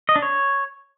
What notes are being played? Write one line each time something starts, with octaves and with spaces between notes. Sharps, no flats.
D#5
D4
C#5